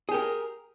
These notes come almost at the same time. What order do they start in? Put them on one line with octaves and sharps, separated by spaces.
G#4 G4 A#4